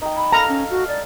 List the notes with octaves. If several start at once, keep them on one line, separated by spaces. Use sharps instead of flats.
D#4 G5
B5
A4 F5 A#5
C#4
F#4
D5